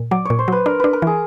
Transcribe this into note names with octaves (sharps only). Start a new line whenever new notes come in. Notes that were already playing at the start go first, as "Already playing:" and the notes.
Already playing: A#2
F#3 D5
A#2 C#5
C5
F#3 B4
D4 A#4
D4 B4
A#4
E3 G#4